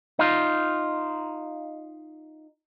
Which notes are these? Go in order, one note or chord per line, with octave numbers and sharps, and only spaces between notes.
D#4 F4